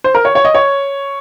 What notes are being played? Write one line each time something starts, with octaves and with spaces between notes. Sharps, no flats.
C5
A#4
C#5
C#5
D#5
C#5